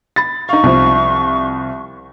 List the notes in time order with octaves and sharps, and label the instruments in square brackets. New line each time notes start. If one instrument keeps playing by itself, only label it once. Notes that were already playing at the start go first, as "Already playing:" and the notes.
[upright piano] B5 A6
[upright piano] D#4 F5 [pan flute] C#6
[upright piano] C2 F3